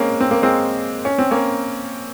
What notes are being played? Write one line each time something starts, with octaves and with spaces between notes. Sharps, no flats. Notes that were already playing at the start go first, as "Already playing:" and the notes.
Already playing: G#3 A#3 C4 C#4
C4
A#3
G#3 C4
C#4
C4
A#3 C#4